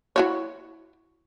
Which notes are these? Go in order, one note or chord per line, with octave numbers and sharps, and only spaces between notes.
E4 F#4 C#5